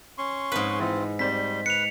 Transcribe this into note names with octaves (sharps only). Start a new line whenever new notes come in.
C#4 C6 C#6
A#1 G#2 C4 B4 D#6
E3 C4 D#4 F4
G3 C4 C5 D5 B6
B4 C#7 F7